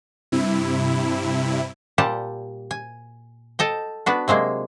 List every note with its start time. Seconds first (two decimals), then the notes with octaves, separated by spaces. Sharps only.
0.32 G2 C3 E4
1.98 A#2 G3 G4 F#5 A5
2.71 G#5
3.59 A4 D#5 G5
4.06 B3 D4 F#4
4.28 C3 F#3 G#3 A#3